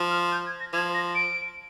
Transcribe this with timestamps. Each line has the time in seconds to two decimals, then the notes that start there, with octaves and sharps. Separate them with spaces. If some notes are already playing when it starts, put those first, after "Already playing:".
Already playing: F3
0.11 F6
0.32 G6
0.46 G#6
0.60 A#6
0.73 F3 G#6
0.94 A#6
1.15 D7